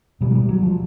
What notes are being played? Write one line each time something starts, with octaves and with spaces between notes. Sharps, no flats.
B2 G3
F#3
G3
F#3
F3